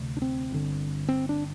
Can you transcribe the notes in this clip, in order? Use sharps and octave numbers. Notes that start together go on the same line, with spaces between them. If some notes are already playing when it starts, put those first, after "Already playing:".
Already playing: D2 C3
D4
C4
G1 G2 D3
C4
D4